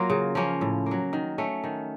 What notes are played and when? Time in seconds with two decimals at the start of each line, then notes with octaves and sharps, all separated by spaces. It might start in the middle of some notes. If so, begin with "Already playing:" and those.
Already playing: F#3 A#3 F4
0.10 C#3
0.35 F3 A#3 C#4
0.61 A2
0.86 A#3
0.91 F#3
1.13 D#3
1.38 A3 C#4
1.64 D#3